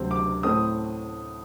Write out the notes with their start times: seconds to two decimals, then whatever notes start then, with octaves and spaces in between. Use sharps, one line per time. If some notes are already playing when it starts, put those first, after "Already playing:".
Already playing: D2 C3 F#3 C4
0.11 D6
0.43 A2 A3 C4 D#6